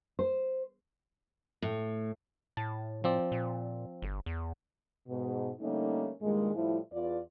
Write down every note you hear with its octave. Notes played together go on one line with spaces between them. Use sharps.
C5
A2
A2 A5
F3 C4 D5
A#2
G1
E2
G#2 B2
D3 G3 A3 A#3 C#4 D#4
G2 A#2 D#3 G#3
A2 F3 G3 E4
E2 F4 D5